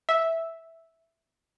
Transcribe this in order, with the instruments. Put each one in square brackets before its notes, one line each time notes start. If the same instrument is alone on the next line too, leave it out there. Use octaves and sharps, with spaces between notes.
[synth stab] E5